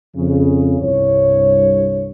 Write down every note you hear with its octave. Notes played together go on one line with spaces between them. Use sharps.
F2 C#3
C2 G2 C#5